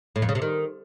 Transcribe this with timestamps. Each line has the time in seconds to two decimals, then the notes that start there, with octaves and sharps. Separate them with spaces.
0.16 A2
0.22 F2
0.29 C#3
0.35 C3
0.42 D#3